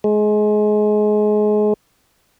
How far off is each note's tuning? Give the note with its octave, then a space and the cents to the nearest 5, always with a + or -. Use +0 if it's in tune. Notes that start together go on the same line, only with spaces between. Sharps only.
G#3 +25